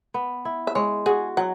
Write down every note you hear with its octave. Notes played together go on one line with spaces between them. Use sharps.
B3
E4
E5
G#3 C#5
F#4 G#4
F#3 F#5